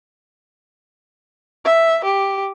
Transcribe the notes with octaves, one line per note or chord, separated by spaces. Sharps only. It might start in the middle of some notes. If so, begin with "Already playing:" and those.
E5
G4